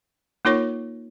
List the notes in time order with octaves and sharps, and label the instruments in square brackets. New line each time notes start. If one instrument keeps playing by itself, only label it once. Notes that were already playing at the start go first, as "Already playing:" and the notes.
[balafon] A#3 D#4 F4 A#4 C#5 C#6